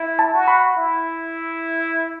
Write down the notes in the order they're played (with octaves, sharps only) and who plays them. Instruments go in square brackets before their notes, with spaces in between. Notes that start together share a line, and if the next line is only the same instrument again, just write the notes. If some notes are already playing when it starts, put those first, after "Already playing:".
Already playing: [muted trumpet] E4
[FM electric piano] A5
[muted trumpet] F#4
[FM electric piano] B5
[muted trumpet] E4